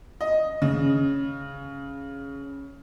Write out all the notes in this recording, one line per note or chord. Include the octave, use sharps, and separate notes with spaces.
D#5
C#3